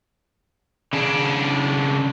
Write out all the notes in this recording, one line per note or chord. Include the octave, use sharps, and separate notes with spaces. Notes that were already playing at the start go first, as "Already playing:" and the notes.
C#3 D4